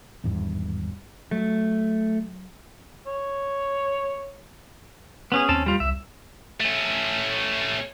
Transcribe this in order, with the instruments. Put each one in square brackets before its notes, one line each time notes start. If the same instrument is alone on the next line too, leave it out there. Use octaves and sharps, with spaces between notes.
[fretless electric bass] G#1 E2 G2
[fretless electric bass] F#3 [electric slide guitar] A3
[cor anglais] C#5
[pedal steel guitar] B3 C#4 G#4
[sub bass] D#2 [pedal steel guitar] C4 C#4 A5
[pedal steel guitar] G3 F4
[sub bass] C2 [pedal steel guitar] E5
[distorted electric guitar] A3 C#4